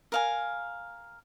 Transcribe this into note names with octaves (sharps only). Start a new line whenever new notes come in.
A#4 F5 G#5